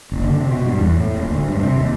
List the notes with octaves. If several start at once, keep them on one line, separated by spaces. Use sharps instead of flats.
F#1
D3
C3
B2
G2
E2
A2
D#1
D2
G2
C3
D#2